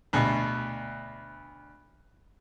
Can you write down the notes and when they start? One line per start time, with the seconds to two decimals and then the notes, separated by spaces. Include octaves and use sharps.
0.13 D2 B2